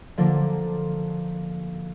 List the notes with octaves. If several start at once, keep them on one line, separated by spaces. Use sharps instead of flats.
D3 F3 A#3 D4